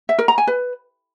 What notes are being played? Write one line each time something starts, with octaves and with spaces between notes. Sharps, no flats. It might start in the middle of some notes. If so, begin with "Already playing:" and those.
E5
A#4
A#5
G#5
B4